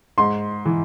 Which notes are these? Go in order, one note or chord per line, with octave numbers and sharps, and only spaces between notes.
G#2 C6
E3